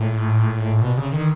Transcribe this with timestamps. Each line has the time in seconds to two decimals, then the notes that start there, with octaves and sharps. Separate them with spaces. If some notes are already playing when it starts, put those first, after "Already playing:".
Already playing: A2
0.82 B2
0.97 C#3
1.12 D#3